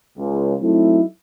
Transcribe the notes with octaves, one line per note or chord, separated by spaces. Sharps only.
C#2
F#3 A3 C4 D#4 E4